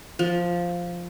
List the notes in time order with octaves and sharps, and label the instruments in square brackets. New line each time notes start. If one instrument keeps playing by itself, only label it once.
[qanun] F3